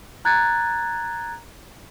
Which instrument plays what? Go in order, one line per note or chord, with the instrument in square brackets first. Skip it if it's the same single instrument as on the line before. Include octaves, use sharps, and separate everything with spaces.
[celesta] A#5 F#6 G#6 A6